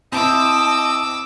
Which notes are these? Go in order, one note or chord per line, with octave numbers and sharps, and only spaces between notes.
C4 E4 D#5 A5 D6 E6